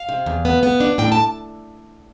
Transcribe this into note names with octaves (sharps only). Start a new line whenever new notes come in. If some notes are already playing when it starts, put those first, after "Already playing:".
Already playing: F5
C3
E2
B3
B3
D4
A2 G5
A5